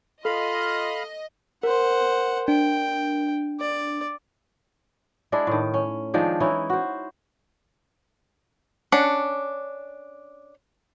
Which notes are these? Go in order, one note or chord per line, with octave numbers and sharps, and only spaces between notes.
F4 A4 D#5 F5 B5 F6
A#4 C5 F#5
D4 G5
D5
G#3 D4 E4 D5
A2 D#3
C#4
D#3 F3 G#3 D4
E3 C#4 D#4 E4
F#4 C5
C#4 D4 F#5